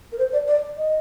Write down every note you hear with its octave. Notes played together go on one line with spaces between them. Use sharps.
A#4
C5
D5
D5
D#5